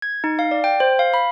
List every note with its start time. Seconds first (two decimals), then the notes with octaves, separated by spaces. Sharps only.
0.02 G#6
0.24 D#4
0.39 F5
0.51 D5
0.64 G5
0.80 C5
0.99 F5
1.14 B5